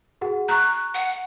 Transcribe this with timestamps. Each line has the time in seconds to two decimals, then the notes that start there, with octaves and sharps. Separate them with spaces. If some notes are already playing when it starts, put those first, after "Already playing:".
0.21 F#4 G#4 F#5
0.49 A#5 C#6 F#6
0.94 F#5